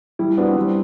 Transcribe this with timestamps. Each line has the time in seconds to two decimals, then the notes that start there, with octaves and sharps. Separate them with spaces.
0.19 G3 E4
0.37 B3 D4 F#4
0.51 C4
0.56 G3 D4